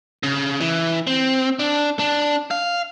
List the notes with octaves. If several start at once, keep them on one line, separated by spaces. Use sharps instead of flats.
C#3
E3
C4
D4
D4
F5